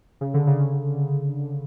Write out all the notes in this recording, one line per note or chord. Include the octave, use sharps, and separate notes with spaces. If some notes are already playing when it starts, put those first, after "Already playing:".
C#3
D3
C#3